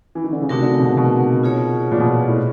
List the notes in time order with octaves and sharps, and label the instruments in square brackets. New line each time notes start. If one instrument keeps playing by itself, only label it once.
[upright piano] E3
D#3
D3
C#3
[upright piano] C3 [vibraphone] A3 C4 D#4 F#4 A#4
[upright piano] D3
C#3
B2
C3
B2
[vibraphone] F4 G#4 C#5
[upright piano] A#2
B2
A#2
A2